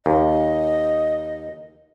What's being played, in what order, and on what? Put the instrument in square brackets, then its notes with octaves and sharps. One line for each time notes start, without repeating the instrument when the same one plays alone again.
[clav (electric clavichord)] D#2 [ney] D#5